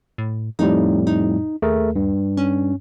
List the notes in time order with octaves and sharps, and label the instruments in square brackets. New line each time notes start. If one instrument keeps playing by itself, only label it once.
[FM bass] A2
[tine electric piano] F2 A2 G3 [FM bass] D#4
[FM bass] D#4
[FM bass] D#2 [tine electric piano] A3 G#4 A#4
[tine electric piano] G2
[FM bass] C#4